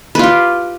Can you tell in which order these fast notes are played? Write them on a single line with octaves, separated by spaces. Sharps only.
B4 F4 G4